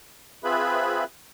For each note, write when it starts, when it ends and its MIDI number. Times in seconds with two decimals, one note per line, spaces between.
0.44 1.04 60
0.44 1.04 65
0.44 1.04 68
0.44 1.04 71
0.44 1.04 76
0.44 1.04 83